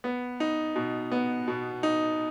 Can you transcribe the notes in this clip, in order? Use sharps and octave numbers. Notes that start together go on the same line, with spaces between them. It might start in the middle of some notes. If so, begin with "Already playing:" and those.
B3
D#4
B2
B3
B2
D#4